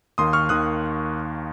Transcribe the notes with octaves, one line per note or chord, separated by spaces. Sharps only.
D#2 D#3 A#3 C6 D#6
C#6 F6
D#2 D#3 A#3 D#6 F#6